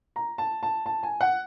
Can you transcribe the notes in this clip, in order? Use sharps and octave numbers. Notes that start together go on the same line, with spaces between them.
A#5
A5
A5
A5
G#5
F#5